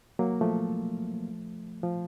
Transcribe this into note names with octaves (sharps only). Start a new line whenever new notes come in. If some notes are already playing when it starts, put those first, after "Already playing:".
F#3 A#3
F3 A3
F3